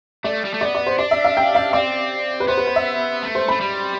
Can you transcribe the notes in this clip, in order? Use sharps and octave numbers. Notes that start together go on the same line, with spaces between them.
A3 D5
G3
A3
B3 D5
D5
C5
D4 D5
E5
F5
G5
F5
C4 D5
B4
B3 C5
B4
C5
E5
A3
C5
A3 B5
G3